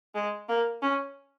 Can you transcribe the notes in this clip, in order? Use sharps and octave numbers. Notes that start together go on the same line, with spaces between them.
G#3
A#3
C#4